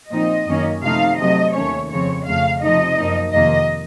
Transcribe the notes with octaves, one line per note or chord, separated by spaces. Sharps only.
A#2 F3 C4 D#4 D#5
F#2 D#3 A#3 C#4
C3 F3 A3 D#4 F5
C3 F#3 A3 D#5
D#2 D#3 A3 C#4 C#5
F2 C#3 F3 C4 C#5
F2 C#3 A3 F5
C3 F3 A3 D#4 D#5
F#2 F3 A#3 D#4
F2 C3 D#3 A#3 D#5